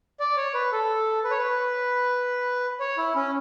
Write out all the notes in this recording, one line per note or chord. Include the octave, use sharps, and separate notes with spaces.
D5
C#5
B4
A4
B4
C#5
B4
C#5
E4
C#4